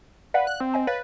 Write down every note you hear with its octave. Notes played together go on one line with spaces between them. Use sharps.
B4 D5 F5 F#5
F#6
C4
C5 D#5 G#5
B4 C#5 F5 A6